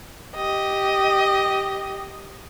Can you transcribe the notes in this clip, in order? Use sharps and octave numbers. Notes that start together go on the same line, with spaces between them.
G4 D#5